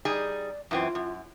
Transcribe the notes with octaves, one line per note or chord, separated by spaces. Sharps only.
G3 D#4 G#4 D5
F#2 E3 C4 F4
F#2